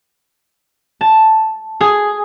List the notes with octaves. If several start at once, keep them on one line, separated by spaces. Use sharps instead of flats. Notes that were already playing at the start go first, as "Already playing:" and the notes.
A5
G#4